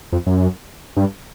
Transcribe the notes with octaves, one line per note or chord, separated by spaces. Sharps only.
F2
F#2
G2